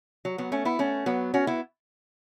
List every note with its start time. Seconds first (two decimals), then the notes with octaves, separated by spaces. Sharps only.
0.25 F#3
0.38 F#3 B3
0.52 A3 C#4
0.65 B3 E4
0.79 A3 C#4
1.06 F#3 B3
1.34 C#4 F#4
1.47 B3 E4